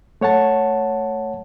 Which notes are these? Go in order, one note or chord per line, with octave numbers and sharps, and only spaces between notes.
A3 C#5 F#5 A5